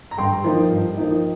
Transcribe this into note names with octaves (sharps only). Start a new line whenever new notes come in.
A#5
G2 G5 C6
F3 A#3 D#4
G2
F3 A#3 D#4